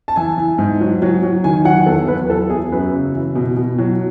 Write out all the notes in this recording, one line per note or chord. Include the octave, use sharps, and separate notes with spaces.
A5
E3 G#5
E3
G#2
F#3
F#3
F#3
D#3 G#5
F#3 F#5
E2 A4
E2 B4
F#3 A4
E2 G#4
F#2 B4
C#3
E3
B2
B2
F#3